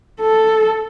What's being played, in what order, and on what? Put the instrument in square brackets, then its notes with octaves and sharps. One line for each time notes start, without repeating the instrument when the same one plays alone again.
[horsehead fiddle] A4